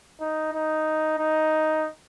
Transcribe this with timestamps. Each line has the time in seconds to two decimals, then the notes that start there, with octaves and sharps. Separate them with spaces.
0.21 D#4
0.54 D#4
1.19 D#4